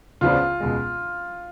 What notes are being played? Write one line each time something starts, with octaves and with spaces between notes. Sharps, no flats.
C#2 C#3 F3 B3 D4 F4
C#2 B2 G#3